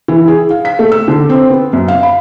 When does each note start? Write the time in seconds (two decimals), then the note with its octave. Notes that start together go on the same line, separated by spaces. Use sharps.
0.08 E3
0.28 G#4
0.50 F5
0.65 B6
0.79 A3
0.92 E6
1.08 D3
1.29 C4
1.50 B3
1.73 F#2
1.88 F5
2.03 B5